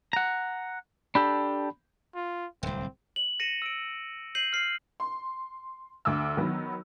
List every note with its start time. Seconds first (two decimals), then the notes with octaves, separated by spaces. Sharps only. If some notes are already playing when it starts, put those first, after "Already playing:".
0.13 F#5 A#5
1.15 D4 G4 A4 B5
2.15 F4
2.63 D1 C2 C4
3.16 F#7
3.40 A#6 C#7 D#7 E7
3.62 E6 D7
4.35 G6 C7 D#7 F#7
4.53 F6 C7
5.00 C6
6.05 D2 D6 E6
6.37 D#3 F#3 B3